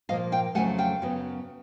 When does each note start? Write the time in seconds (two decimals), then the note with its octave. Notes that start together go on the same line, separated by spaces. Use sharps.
0.09 A#2 F3 A#3 D#5 F5
0.32 F5 G5
0.55 F2 C#3 F#3 A3 F#5 G#5
0.78 F5 G5
1.02 F#2 C#3 F#3 B3